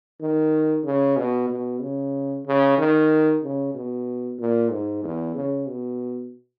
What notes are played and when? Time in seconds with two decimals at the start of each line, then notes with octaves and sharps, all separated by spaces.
0.21 D#3
0.84 C#3
1.17 B2
1.50 B2
1.81 C#3
2.45 C#3
2.78 D#3
3.43 C#3
3.74 B2
4.38 A#2
4.71 G#2
5.04 E2
5.36 C#3
5.68 B2